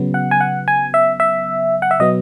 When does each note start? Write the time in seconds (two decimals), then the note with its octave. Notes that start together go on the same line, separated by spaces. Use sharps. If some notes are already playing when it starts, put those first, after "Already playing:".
Already playing: C#3 F#3 B3
0.14 F#5
0.31 G#5
0.41 F#5
0.68 G#5
0.94 E5
1.20 E5
1.82 F#5
1.91 E5
2.00 B2 F#3 B3 D#5